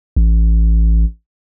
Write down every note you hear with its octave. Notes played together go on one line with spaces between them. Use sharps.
A1